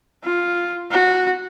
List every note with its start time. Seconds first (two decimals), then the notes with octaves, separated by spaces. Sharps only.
0.24 F4
0.91 F#4